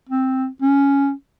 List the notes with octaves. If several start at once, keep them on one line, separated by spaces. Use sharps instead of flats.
C4
C#4